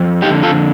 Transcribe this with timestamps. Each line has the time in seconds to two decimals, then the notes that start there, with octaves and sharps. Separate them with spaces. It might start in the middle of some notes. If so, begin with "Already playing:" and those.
Already playing: F2
0.22 D3 D#4 G4
0.43 F4 A4